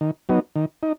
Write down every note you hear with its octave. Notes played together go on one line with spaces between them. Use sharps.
D#3
F#3 B3 D#4
D#3
D#4